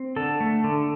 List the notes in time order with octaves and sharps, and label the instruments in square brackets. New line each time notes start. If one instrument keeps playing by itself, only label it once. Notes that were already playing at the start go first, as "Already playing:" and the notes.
Already playing: [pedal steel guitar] C4
D3 A4
A3
D3